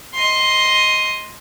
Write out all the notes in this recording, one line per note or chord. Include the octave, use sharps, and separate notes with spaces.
D#5 C6